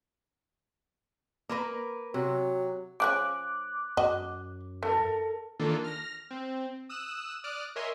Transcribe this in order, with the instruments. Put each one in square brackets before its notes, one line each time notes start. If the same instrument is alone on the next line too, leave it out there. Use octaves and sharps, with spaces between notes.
[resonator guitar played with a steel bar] A#3 A#4 B4
[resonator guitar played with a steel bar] C3 [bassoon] F#3
[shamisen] C#3 F3 C#4 [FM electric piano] D6 F#6
[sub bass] F#2 [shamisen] F#4 D#5
[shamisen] E3 [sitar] A4 A#4
[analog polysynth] D#3 E3 A#3 D4 F4 A4
F6 A#6
C4
D#6 E6 F#6 E7
D5 D#6 F6 F#6 D7
A#4 C#5 D#5 E5 G#5 C6